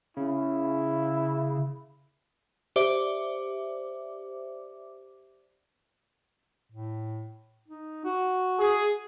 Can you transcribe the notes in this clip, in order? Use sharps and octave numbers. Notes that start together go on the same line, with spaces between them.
C#3 E4
G4 C5 D5 E5 D6
A2
D#4
F#4
G#4